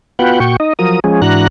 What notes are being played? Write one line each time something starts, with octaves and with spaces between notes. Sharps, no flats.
B3 F4 F#4 B4 F#5 G5
A#2 F#4 G5 C#6
D#4 D#5
F3 F#3 A#4 D#6
F3 G#3 C#4 G#4
G#2 E3 D4 F#4 A#5 F#6